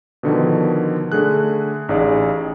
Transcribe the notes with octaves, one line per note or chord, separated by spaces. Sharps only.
B2 D3 D#3 F3
D3 A3 G#4 F#6
A1 D#4 G#4 D5 F5